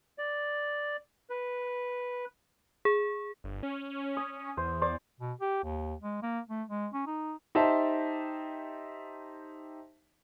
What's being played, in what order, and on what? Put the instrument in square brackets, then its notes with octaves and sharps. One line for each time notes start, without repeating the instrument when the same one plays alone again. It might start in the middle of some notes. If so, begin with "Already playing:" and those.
[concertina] D5
B4
[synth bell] G#4
[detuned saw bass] G1
C#4
[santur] D#6
[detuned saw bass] E2 [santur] C5
[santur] C5 D5 D6
[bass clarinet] B2
G4
D#2
G#3
A#3
A3
G#3
C#4
D#4
[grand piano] D#4 G4 C5 E5 A5